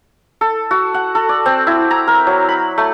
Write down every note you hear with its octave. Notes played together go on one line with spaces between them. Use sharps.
A4
F#4
F#5
A4
D5
C4
E4
A#5
A#4
F#3
B5
A3